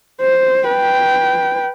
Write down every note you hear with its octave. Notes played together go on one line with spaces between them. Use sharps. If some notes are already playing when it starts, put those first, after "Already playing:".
C5
B4 G5